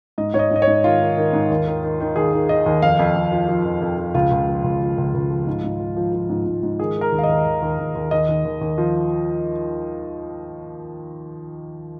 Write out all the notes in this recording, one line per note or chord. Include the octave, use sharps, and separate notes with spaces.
G#2 D#5
G#2 C#5
D#5
G#2 D#5
C#5
G#2
D#3 F4
D#3
D#3
G#2
D#2
D#3
D#3
D#3
D#2 G#4
D#3
D#3 D#5
D#2
F2 F5
F2
F2
F3
F3
F2
F2
F3
C#2 F4
C#2
F3
C#2
F3
C#2
C#2
F3
G#2
G#2
F3
F3
F3
G#2
G#2
G#2
D#3 G#4
D#3
A#4
D#2
F5
D#5
D#2
D#2
D#2
D#2
D#2
D#2 D#5
D#2
D#2
D#2
F3